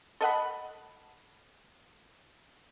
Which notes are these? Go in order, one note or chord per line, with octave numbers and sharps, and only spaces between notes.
A4 D#5 F#5 B5